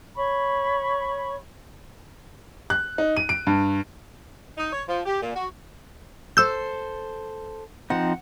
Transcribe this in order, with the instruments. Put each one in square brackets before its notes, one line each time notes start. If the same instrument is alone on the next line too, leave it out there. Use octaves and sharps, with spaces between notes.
[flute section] C#5 B5 C#6
[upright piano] F#6
D#4
D#7
D7
G2
[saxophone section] D#4
C#5
F3
G4
A#2
F#4
[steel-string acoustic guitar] A4 C5 [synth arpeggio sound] E6 G6
[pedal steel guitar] F3 C4 D#4 [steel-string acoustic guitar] F#5